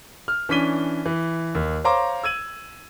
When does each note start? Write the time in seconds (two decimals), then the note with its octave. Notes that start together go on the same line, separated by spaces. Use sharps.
0.28 F6
0.49 E3 C#4 D4 B6 D#7 G7
1.05 E3
1.55 D#2
1.84 C5 C#5 F5 A#5 C6 D6
2.24 E6 G#6 D#7 F#7